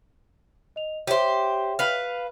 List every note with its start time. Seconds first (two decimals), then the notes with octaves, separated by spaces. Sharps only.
0.76 D#5 F7
1.07 G4 C5 C#5 E5 G5
1.79 B4 F5